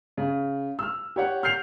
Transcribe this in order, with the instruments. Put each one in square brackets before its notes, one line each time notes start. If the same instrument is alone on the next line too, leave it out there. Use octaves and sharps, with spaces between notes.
[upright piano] C#3
E6 F6
G4 C#5 F#5
F6 G6 C7 F7